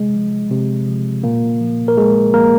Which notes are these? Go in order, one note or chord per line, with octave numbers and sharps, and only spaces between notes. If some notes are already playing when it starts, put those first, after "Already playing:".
Already playing: C3 G#3
F3
C3
F3
A#2 A#3
F3
A#4
A#2 G#3 G#4
F3 A#3 A#4